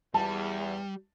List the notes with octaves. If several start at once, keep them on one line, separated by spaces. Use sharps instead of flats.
E2 G3 A5